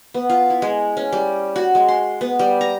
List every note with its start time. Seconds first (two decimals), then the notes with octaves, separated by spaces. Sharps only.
0.14 B3
0.30 F4
0.50 E4
0.62 G#3
0.97 C#4
1.13 G3
1.56 F#4
1.75 G#3
1.88 C6
2.21 B3
2.39 G3
2.61 A#5